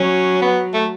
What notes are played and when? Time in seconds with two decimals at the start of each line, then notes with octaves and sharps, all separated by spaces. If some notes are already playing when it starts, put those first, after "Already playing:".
Already playing: F#3 C#4
0.42 B3
0.74 A3